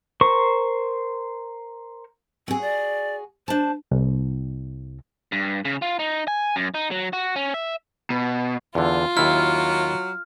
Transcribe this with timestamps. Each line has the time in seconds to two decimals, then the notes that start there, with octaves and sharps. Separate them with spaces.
0.21 A#4 C5 C#6
2.48 C4 F#4 G#4
2.61 D5
3.48 D4 C5 A5
3.91 C2
5.32 G2
5.65 C#3
5.82 F4
5.99 D#4
6.28 G#5
6.56 F#2
6.74 D#4
6.91 F#3
7.13 F#4
7.36 C#4
7.54 E5
8.10 B2
8.75 E2 D3 F4
9.17 D#2 F#3 E4 F6